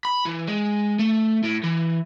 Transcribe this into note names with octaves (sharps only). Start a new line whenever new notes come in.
B5
E3
G#3
A3
A2
E3